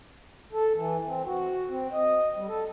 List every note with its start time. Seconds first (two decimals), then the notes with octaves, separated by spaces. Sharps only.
0.53 A4
0.75 E3
1.06 C4
1.26 F#4
1.69 C4
1.92 D#5
2.36 G3
2.48 A4